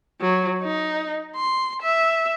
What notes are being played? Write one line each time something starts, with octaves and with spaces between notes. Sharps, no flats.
F#3
D#4
C6
E5